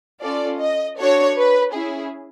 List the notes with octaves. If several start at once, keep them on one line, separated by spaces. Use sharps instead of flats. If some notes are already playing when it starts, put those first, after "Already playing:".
C#4 F4 A4 D5
D#5
D4 F#4 A4 C#5
B4
C#4 E4 G#4